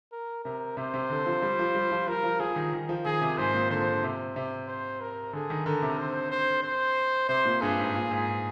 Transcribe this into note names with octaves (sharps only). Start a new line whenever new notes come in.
A#4
C3 A#4
C3 C5
C3
D3
F3
G3
F3
G3
F3
F3 A#4
F3
F3 G#4
D#3
D#3
F3
D#3 G#4
C3
G#2 C5
A#2
D3 C5
D3
C3
C3
C5
A#4
D3 G#4
D#3
D3 A#4
C3
C5
C5
C5
C3 C5
A#2
G2 G#4
G#2
A#2
G#2